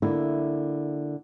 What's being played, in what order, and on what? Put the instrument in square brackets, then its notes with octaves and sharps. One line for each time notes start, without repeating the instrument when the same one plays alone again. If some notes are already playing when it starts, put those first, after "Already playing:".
[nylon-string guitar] D3 A#3 E4